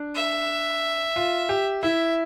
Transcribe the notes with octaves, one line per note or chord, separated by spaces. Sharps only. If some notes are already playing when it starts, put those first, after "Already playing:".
Already playing: D4
E5
F4
G4
E4 E5